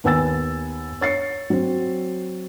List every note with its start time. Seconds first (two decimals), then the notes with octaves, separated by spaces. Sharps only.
0.04 D#2 B3 G#5 E6 A6
1.01 C#5 A6 C7 C#7
1.50 F#3 C4